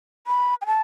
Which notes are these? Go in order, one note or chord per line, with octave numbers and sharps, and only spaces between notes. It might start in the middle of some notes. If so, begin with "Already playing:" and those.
B5
G#5
A5